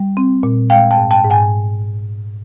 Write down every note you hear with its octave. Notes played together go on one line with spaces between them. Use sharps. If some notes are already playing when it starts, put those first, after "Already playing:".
Already playing: G3
C4
A#2
G#3 F5 G5
G5 A5
G#2
G5 A5
G#2
F#5 G#5